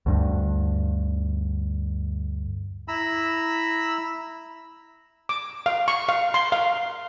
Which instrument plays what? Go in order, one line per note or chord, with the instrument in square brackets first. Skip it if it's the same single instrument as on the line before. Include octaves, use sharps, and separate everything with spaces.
[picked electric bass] D2 G2 D3
[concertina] E4 A#5 B5 E6
[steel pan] D6
F5
C#6
F5
C6
F5